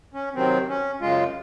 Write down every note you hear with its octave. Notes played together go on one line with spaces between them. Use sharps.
C#4
C3 D#3 F#3 C4
C#4
F#2 C#3 G#3 F4